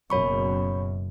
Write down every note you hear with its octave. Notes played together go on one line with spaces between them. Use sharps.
F#1 F#2 B2 C#5 B5 C#6